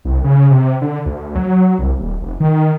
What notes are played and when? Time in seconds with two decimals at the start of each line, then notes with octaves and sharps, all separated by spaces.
0.05 C2
0.24 C#3
0.51 C3
0.81 D3
1.06 D2
1.35 F#3
1.79 C2
1.99 D#1
2.22 F1
2.40 D#3